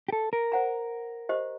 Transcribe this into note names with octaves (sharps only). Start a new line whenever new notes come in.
G4
A4
A#4
C5 F#5 A#5
G4 C5 D#5